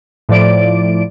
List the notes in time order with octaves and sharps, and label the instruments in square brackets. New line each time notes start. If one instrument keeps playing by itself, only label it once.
[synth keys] A2 F3 D5 D7